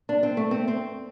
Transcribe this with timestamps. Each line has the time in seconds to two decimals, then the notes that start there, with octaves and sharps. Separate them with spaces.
0.09 D4
0.23 C4
0.37 A3
0.51 C4
0.68 C4